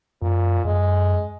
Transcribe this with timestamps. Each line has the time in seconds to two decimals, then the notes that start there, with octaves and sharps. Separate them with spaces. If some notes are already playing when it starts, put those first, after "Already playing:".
0.22 F#2 A#2
0.65 F#2 G#3